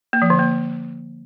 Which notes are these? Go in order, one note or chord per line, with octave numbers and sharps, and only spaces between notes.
A#3
F3
D3
A#3